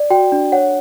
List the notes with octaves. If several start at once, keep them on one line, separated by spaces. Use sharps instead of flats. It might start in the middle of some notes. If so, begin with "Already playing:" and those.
Already playing: D5
F#4 G5
D4
C#5 F#5